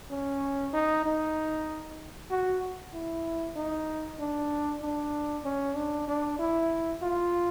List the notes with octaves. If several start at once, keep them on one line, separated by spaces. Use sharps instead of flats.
C#4
D#4
D#4
F#4
E4
D#4
D4
D4
C#4
D4
D4
E4
F4